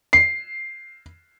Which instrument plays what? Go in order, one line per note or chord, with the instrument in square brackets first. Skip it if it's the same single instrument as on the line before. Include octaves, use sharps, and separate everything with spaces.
[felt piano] C7